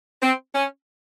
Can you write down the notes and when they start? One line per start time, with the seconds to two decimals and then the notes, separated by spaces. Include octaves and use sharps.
0.22 C4
0.54 C#4